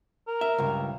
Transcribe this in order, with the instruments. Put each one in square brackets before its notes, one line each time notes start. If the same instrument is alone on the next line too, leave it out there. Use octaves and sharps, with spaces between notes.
[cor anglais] A#4
[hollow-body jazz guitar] E5
C#2 G2